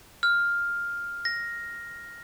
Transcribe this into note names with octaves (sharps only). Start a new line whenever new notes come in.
F6
A#6